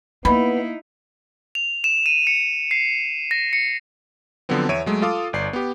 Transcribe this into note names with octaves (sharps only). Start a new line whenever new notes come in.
A#3 B3 D#4 E4 B5
F7
E7
D#7
C#7
C7
A#6
C#7
D3 F3 F#3 B3 C4
E2 C#5 E5 D7 D#7
F#3 G#3 A3
F4 A4 F5 D6 D#6
G1 D5 C7
B3 G4